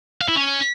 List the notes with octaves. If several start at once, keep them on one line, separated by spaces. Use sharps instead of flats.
F5
E4
C#4